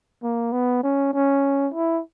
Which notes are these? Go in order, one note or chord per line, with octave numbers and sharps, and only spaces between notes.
A#3
B3
C#4
C#4
E4